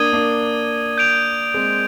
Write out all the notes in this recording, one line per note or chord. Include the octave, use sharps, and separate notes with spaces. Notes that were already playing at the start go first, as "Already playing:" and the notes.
Already playing: A#3 D4 D#6 G#6 D#7 G7
A#3 D4
G6 D7 F7
G#3 C4